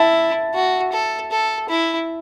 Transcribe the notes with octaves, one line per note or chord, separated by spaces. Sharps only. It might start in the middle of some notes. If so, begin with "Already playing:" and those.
Already playing: E4 E5 A5
F#4
A4
A4
E4